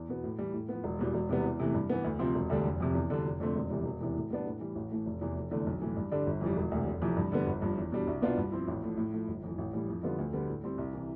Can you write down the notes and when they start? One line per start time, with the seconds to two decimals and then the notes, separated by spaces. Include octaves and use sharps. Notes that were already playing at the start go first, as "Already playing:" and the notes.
Already playing: E2
0.09 B2 B3
0.24 A2
0.38 E3 G3
0.54 A2
0.69 F3 B3
0.84 E1
0.99 E2 B2 G3
1.14 E1
1.29 E2 C3 G3 B3
1.44 E2
1.59 C3 E3 A3
1.74 G2
1.89 E3 B3
2.04 D2
2.19 C3 F3 C4 F4
2.35 E1
2.50 D2 D3 G3 D4
2.65 F1
2.80 F2 C3
2.95 E2
3.10 D3 G3 D4
3.25 F1
3.40 F2 D3 A3 C4
3.55 E1
3.70 E2 C3 E3 G3
3.85 E1
4.00 E2 C3 E3
4.15 A2
4.30 G3 B3 D4
4.46 A2
4.60 E3 G3
4.75 A1
4.91 A2 E3 A3
5.06 F1
5.21 E2 C3 E3
5.36 F1
5.51 E2 D3 A3
5.67 B1
5.82 A2 E3
5.96 G2
6.11 D3 G3 D4
6.26 G1
6.41 F2 E3 G3
6.57 E1
6.72 D2 C3
6.87 F1
7.02 F2 C3 E3
7.16 G2
7.32 D3 G3 B3
7.46 G1
7.62 G2 F3
7.77 E2
7.92 B2 G3 D4
8.07 C2
8.22 B2 B3 D4 F4
8.37 G2
8.52 F3 C4 E4
8.67 A1
8.82 A2 F3 A3
8.97 A2
9.13 F3 A3
9.28 G1
9.43 F2 E3
9.58 A1
9.73 A2 E3 G3
9.88 F2
10.03 D3 G3 B3 F4
10.18 D2
10.33 D3 G3 B3
10.48 A2
10.64 G3 C4 E4
10.78 C2
10.93 C3 E3